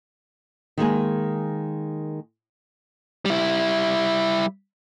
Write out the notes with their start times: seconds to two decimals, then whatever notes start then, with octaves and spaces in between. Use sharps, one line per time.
0.78 D#3 G#3 A#3 G#4
3.26 G3 E4